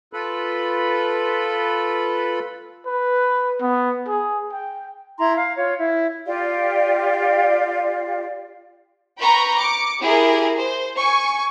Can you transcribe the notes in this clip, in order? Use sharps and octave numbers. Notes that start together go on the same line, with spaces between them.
F4 A4 B4 B5
B4
B3
G#4
G5
E4 A#5 C6
F5
F4 C#5
E4
F4 G4 D5 F5
B4 G5 A#5 B5 C#6
D6 C#7
E4 G4 G#4 A#4
C5
G#5 C#6